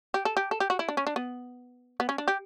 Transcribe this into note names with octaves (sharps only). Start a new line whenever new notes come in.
G4
A4
G4
A4
G4
F#4
E4
D4
C#4
D4
B3
B3
C#4
D4
G4